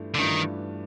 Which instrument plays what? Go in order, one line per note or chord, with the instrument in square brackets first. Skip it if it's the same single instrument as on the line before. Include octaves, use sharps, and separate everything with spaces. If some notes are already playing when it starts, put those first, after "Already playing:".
Already playing: [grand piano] G2 E3 A3 D4 F4
[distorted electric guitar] D3
[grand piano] G2 E3 A3 D4 F4 [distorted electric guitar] D#3